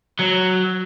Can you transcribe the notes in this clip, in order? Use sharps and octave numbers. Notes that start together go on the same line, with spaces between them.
F#3